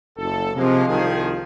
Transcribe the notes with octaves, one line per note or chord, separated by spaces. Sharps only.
F#1 A4
C3 F3 G#3 A#3
C2 D#3 F3 G#4